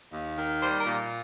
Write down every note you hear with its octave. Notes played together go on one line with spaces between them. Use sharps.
D#2
D#3
G3 C5
A#4
A#2